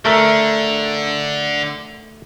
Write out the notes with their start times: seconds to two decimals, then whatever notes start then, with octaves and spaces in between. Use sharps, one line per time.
0.05 D3 A3 A#4 E5